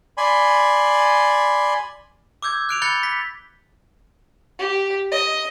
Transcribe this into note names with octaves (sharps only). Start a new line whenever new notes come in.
D5 G#5 B5 C6
D6 E6 G6 G#6
F#6 D7 F7
B5 F#6 G6 A6 C#7 G7
B6
G4
D#5